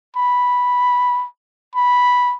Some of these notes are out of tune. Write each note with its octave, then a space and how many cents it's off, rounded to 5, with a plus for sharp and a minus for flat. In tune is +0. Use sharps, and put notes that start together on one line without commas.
B5 -5
B5 -5